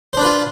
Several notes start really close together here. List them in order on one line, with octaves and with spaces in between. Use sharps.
C5 D4 B4 F4